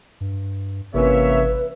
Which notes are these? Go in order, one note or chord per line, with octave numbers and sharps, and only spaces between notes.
G2
G#1 C3 E3 A#3 C#4 B4 C#5 E5